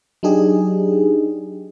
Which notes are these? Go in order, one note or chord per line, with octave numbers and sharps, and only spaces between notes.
F#3 D4 D#4 G4 G#4